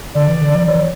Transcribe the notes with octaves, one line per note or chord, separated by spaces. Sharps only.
D3 D5
E3
D3
F3
E3 C#5